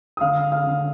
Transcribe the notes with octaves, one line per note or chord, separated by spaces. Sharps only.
D#6
D3 F5 F6
F5 F6
D3